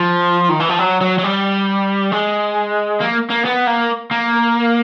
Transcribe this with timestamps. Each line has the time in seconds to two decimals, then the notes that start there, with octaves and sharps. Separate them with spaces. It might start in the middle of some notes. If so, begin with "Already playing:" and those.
Already playing: F3
0.50 D#3
0.60 E3
0.69 F3
0.79 F#3
1.01 F#3
1.19 F#3
1.24 G3
2.12 G#3
3.00 A#3
3.30 A#3
3.45 B3
3.67 A#3
4.11 A#3